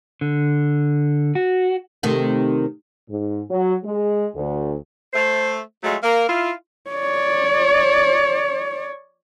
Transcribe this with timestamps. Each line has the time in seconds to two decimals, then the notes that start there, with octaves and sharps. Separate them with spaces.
0.21 D3
1.35 F#4
2.03 C3 D#3 A3
3.08 G#2
3.49 F#3
3.83 G#3
4.34 D2
5.14 A3 C5
5.83 F#3 G#3 A3 F4
6.02 A#3 A#4
6.28 E4 F4
6.90 C#5 D5